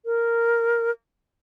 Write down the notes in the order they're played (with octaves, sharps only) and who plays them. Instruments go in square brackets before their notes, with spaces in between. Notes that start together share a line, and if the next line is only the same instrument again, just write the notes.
[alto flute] A#4